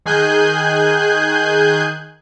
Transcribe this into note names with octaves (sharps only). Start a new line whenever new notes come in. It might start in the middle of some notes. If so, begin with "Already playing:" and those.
D#3 G#4 G#5 F#6 G6